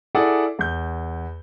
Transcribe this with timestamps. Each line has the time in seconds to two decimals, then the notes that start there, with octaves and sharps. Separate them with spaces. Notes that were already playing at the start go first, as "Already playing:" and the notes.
0.15 E4 G#4 A4 D5 F#5
0.59 E2 G6